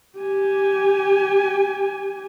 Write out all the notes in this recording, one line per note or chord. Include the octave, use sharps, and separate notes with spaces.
G4 G#5